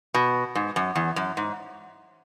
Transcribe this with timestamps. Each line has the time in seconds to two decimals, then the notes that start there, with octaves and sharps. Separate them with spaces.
0.14 B2
0.55 G#2
0.76 F#2
0.95 E2
1.16 F#2
1.37 G#2